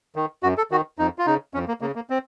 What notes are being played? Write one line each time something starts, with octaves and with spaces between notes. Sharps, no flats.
D#3
F#2 F#4
A4
D#3 F#4
F2 D#4
F4
C#3 D#4
F2 C#4
A#3
C#3 A#3
A#3
C4